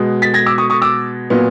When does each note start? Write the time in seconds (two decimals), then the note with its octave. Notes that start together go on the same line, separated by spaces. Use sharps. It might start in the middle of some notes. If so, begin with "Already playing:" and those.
Already playing: B2 G#3 B3
0.22 A6 B6
0.34 G#6 A#6
0.46 D6 E6
0.58 C#6 D#6
0.70 C#6 D#6
0.82 D6 E6
1.30 A#2 F#3 B3